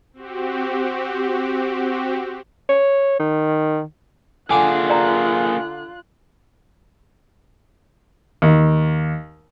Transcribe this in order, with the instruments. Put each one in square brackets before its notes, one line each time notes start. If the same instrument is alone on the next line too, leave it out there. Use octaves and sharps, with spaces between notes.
[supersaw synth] C4 F#4 G4
[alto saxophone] C#5
D#3
[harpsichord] D3 D6 [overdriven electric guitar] A#3 G#4 [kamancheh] F4 F#6 [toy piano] G#5
[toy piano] D5 A#5
[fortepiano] D#2